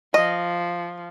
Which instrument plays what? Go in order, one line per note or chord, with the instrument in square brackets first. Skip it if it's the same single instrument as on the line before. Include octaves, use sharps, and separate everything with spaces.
[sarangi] F3 [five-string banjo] D#5